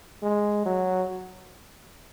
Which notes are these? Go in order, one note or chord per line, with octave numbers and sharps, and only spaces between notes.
G#3
F#3